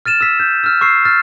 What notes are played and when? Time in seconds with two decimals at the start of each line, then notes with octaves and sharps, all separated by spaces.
0.06 F6 A6 D#7 E7
0.21 E6 B6
0.40 G6
0.64 E6 F6
0.81 C#6 E6 C7
1.05 F6 A6